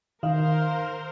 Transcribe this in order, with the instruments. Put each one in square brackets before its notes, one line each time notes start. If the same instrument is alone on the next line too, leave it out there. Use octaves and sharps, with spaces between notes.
[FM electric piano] D#3 [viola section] A#4 C5 [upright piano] F5